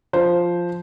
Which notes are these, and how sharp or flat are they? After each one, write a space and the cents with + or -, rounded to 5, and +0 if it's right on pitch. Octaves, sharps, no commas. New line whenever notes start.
F3 +0 C5 +0